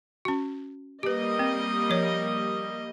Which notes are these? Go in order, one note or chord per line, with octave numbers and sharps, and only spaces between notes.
C#4 F#4
G3 A#3 G4 B4 D#5
C4
F3 C#5